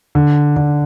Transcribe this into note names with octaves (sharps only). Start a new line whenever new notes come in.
D3
D3